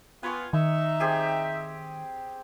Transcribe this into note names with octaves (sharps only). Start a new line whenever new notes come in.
B3 F4 G#5 C#6
D#3 D#4 E5
C4 G4 G#4